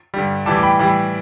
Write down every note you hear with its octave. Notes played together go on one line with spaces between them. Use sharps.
G2 D3 G3
A2 E3 G3 A5 D6
D6
G5 B5
A2 E3 G3 G5 B5